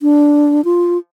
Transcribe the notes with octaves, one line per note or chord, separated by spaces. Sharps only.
D4
F4